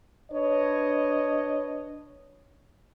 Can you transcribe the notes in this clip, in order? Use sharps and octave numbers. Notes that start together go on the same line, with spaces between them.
D4 B4 C#5 D#5